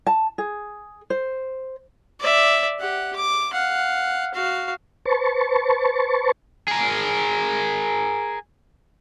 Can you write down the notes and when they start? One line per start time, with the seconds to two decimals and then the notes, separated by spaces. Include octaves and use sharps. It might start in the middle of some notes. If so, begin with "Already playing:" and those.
0.07 A5
0.38 G#4
1.10 C5
2.20 D5 E5
2.80 G4 F#5
3.15 D6
3.53 F5 F#5
4.34 F#4 F5
5.05 B4 C5 A5 C#6
6.68 G#4 A#4